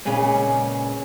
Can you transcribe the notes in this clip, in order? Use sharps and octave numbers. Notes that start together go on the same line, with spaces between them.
A#2 C#3 G#3 B3 C#4